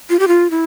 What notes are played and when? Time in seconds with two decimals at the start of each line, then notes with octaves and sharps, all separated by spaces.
0.10 F4
0.19 G4
0.28 F4
0.51 E4